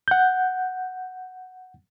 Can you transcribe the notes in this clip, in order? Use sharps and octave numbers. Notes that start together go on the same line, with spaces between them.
F#5 G6